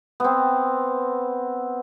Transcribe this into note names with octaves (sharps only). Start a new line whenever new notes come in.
B3 C4